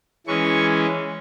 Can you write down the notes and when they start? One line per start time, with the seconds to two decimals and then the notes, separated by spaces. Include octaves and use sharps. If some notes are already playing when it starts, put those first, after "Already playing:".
0.27 E3 G#3 C#4 C#6